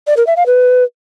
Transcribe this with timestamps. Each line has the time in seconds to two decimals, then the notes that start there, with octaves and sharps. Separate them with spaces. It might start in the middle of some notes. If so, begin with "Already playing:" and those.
0.07 D5
0.17 A#4
0.27 E5
0.36 F5
0.46 B4